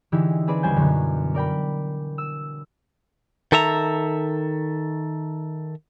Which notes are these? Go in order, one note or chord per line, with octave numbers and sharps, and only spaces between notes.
D3 E3 D#4 E4 G4 G#4
C4 G#4 B4 D5
C#2 C#3 G3 C5 G#5 G6
F#2 B2 D3
A#4 D5 G5 B5
E6
D#3 A4 E5 A#5